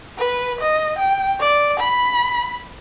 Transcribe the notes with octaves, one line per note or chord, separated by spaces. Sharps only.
B4
D#5
G5
D5
B5